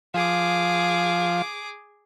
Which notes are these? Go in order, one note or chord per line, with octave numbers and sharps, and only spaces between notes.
F3 G#4 D6